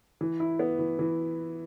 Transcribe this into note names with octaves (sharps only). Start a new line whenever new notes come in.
E3
E4
B3
E3
E3